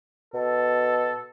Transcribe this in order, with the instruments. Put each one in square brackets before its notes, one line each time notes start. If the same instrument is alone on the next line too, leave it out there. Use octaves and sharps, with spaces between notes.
[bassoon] B2 [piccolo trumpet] A4